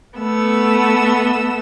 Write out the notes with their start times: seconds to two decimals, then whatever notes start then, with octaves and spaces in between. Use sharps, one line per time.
0.17 A3 B3 E6